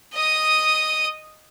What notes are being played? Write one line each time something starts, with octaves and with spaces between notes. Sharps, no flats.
D#5 D#6